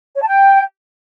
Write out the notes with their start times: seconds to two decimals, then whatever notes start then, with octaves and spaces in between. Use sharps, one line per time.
0.17 C#5
0.22 A5
0.28 G5